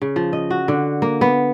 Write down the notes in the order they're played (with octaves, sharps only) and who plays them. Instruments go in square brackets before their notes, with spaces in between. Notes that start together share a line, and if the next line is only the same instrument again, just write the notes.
[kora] C#3
F3
D#5
F#4
D3
A#3
B3